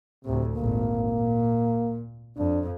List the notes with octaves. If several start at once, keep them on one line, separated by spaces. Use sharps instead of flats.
D2 A2 C3
G#1 A#2 A#3
A#2
F2 D4